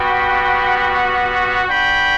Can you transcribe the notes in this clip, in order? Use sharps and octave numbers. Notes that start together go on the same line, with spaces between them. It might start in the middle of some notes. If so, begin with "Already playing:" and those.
Already playing: G3 B3 F#4 G5 B5
B3 D4 F#4 G5 B5